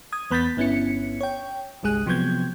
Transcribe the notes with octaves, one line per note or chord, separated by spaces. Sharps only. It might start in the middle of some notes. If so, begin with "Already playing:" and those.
D#6 G#6
E2 B3 B5 G6 A6 B6
G1 B3 C#4 E4 C#7
C#5 G5
G1 C2 G#3 G#4 F#6
C3 F3 F#3 B3 G6 G#6